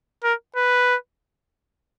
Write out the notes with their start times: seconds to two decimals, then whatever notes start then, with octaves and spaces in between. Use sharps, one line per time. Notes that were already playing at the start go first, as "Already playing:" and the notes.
0.23 A#4
0.56 B4